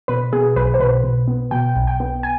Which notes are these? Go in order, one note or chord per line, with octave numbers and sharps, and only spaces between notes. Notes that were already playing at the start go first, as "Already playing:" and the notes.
B2 B4
B2 G#4
B1 B4
C5
B2 B4
B2
B3
B2 G5
B1
G5
B3
G#5